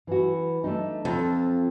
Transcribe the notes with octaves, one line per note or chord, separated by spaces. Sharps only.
E3 F#4
A3 D4 D#4
F2 F4